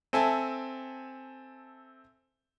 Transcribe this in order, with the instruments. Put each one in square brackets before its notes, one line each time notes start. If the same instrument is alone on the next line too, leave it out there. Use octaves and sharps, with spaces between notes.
[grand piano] C4 A4 E5 G#5 A5